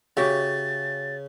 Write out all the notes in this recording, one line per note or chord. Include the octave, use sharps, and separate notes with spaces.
C#3 F#4 G4 E5 A6